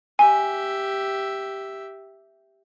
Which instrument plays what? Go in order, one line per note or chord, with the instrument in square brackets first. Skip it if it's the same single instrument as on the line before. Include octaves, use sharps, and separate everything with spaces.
[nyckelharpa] G4 E5 [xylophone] G#5